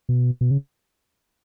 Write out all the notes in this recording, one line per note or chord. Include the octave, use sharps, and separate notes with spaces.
B2
B2
C#3